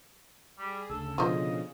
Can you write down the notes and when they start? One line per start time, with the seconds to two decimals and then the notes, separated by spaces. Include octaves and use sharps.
0.59 G3 G#4
0.90 D2 C#3 A4
1.18 B2 D3 F3 F4 C5 D#5